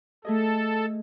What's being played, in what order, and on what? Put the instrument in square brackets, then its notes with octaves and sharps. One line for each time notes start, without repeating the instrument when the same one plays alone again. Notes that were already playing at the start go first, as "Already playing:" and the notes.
[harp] A3 G#4 D#5 [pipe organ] A4